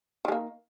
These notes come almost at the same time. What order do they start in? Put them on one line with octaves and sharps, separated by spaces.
D#3 G#3 A#3